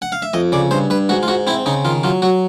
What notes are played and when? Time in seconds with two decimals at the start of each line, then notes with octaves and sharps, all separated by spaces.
0.02 F#5
0.12 F5
0.22 E5
0.33 F2 D#5
0.52 C#3 D5
0.71 G2 C5
0.90 G2 B4
1.09 G#2 F#4
1.23 F4
1.28 G#2 F#4
1.47 C4 E4
1.66 C#3 D#4
1.85 D#3 F4
2.04 F#3 F4
2.22 F#3 F#4